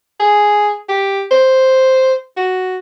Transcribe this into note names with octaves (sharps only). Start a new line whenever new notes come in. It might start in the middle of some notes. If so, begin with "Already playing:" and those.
G#4
G4
C5
F#4